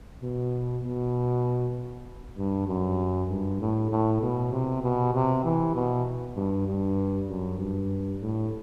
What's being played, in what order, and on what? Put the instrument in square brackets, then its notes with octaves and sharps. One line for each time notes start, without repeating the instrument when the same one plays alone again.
[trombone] B2
B2
G2
F#2
G2
A2
A2
B2
C3
B2
C3
E3
B2
G2
G2
F#2
G2
A2